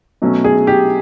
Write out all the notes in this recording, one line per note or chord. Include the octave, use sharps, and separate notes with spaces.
B2 F#3 A3 C#4
G#4
G4